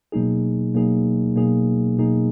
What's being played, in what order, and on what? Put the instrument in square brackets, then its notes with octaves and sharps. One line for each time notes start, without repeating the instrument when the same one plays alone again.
[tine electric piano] B2 F#3 A#3 D#4 G#4
B2 F#3 A#3 D#4 G#4
B2 F#3 A#3 D#4 G#4
B2 F#3 A#3 D#4 G#4